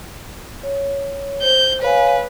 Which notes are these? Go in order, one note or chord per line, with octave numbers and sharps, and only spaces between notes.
C#5
C5 G6
B4 C#5 F5 G#5